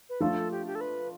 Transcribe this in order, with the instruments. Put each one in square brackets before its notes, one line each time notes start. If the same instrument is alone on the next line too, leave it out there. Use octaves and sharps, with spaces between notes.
[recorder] B4
[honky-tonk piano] F3 A3 D4 F4 [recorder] A4
[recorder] G4
G4
A4
B4